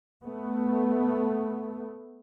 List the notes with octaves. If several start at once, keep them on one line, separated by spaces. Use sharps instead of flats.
A3 B3